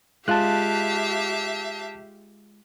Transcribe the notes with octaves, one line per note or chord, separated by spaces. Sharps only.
G#3 F4 G4 E5 F5 A5 F#6